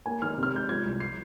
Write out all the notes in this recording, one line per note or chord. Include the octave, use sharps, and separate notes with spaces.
A#3 G#5
D#3 F6
C3
F6
G#3 G6
F3 G#6
C2
C7